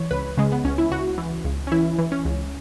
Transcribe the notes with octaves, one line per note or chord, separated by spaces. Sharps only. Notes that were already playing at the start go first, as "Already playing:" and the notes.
Already playing: E3 C#5
C#2 B4
C#3 G#3
B3
C#2 C#4
E4
C#2 F#4
E3
C#2
C#4
E3 E4
E3
C#4
C#2